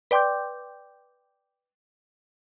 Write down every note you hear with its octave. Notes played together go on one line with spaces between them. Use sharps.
B4 D5 G5 C6 D6 G6